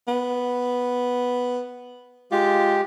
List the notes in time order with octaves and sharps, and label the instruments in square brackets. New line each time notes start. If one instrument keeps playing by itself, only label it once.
[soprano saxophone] B3
[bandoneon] G#3 G4 [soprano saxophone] F4